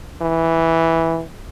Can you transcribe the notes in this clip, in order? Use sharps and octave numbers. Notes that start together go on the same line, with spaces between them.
E3